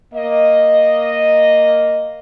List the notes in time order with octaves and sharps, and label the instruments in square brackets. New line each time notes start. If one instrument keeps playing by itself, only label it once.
[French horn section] A#3 D#5